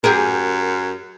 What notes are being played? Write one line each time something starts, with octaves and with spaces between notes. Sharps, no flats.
F#2 G4 G#4 A#4